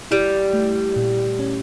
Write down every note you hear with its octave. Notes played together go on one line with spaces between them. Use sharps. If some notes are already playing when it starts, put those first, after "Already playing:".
G3 E4
A3
A#2
C#4